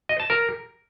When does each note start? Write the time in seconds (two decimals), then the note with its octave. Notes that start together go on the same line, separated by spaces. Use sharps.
0.09 D#5
0.20 A5
0.30 A#4